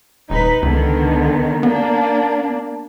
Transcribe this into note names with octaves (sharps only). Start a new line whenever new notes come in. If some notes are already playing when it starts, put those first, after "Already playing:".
D#1 D#4 B4
C#2 D3 D#3 B3
A#3 B3 D4